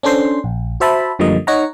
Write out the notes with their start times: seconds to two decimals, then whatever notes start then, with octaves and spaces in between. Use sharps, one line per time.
0.03 C#4 D4 A4 C5 C6
0.44 A#1
0.80 F#4 C5 E5 A5 B5
1.19 F#2 D3 F3 G3 A#3 D#5
1.47 D#4 C#5 F#5 A#5